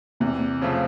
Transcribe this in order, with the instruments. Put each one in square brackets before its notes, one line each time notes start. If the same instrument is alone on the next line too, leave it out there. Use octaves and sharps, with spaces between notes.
[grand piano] E2 [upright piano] C3
[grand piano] C#3 F3 A3 C4